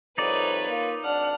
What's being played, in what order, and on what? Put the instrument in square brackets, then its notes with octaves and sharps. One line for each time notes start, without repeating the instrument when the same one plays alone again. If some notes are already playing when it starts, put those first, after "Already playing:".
[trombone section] C2 F2 [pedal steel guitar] D#4 D5 [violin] B4 C#5
[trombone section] A#3 F4
[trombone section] G#1 D4 [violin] F#5 F6